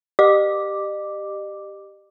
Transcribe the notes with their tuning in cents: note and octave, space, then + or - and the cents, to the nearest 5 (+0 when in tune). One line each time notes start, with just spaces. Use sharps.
G4 +0 D#5 -40 D6 +0